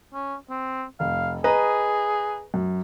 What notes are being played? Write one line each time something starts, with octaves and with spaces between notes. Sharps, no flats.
C#4
C4
F1 F5
G#4 B4 D#5 A#5
F#2